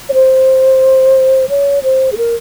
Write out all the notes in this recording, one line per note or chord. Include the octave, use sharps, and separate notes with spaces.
C#5
C5
C#5
C5
G#4
A#4